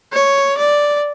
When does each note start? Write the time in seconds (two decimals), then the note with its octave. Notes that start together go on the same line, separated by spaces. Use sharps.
0.12 C#5
0.58 D5